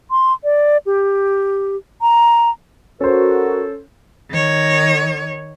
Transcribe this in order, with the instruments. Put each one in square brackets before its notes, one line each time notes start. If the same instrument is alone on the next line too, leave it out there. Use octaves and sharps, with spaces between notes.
[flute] C6
D5
G4
A#5
[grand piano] C#4 C5 [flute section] F#4 [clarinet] A4 [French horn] A#4
[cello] D#3 C#5